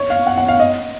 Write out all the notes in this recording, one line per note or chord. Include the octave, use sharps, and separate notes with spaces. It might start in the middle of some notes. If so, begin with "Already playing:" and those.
Already playing: C#5
F5
F#5
F#5
F5
D#5